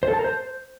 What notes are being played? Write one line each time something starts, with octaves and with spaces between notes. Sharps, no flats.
C5
A4
A5
A#4
C5